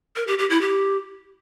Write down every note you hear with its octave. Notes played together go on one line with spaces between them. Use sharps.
A#4
G4
G4
E4
G4